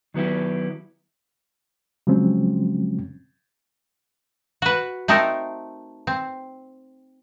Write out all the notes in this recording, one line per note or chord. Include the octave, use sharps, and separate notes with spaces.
D#3 F#3 B3 E4 G4
C#3 F3 F#3 G#3 C4 C#4
F#4 B4
A3 C4 D#4 A4 A#4
C4